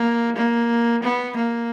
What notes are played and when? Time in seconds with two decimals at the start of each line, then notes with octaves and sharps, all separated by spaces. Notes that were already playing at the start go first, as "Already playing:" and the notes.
Already playing: A#3
0.36 A#3
1.03 B3
1.36 A#3